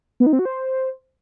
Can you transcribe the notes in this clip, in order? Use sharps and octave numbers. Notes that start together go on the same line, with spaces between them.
B3
D#4
C4
F#4
C5